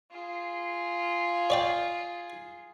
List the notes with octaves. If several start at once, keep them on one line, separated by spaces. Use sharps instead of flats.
F4 G#4
C#5 D5 G5